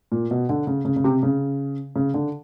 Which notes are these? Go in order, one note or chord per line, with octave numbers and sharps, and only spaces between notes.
A#2
B2
D3
C#3
C#3
C#3
C3
C#3
C#3
D3